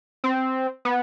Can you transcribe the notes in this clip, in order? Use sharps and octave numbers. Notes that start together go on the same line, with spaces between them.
C4
B3